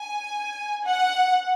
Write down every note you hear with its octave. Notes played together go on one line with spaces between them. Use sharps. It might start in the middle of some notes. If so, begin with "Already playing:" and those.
Already playing: G#5
F#5